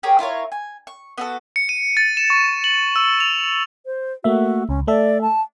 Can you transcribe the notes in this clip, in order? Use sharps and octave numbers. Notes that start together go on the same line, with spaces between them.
G4 G#4 A#4 C#5
E4 F4 A#4 C#5
G#5
C#6
B3 F#4 A4
C#7
D#7
A6
E7
C#6
F#7
E6
F7
C5
A3 A#3 F#4 E5
C#2 C#4
A3 A4 D5 E5
A5